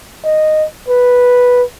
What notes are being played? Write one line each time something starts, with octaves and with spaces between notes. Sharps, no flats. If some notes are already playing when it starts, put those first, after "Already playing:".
D#5
B4